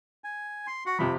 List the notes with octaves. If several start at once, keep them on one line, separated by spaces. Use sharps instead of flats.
G#5
C6
F#4 F#5
F2 C3 F3 B5